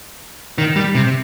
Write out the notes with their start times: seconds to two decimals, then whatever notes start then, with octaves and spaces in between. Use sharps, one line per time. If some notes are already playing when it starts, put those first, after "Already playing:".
0.58 D#3
0.76 G3
0.95 C3